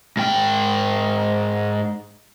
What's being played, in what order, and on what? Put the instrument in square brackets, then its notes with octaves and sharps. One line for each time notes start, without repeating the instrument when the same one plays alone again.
[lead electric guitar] G#2 G5